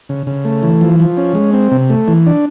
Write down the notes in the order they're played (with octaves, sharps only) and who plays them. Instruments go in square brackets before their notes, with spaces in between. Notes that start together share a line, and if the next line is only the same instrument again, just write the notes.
[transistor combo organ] C#3
C#3
A3
E3
F3
F3
C#4
G#3
C4
C3
A3
E3
D4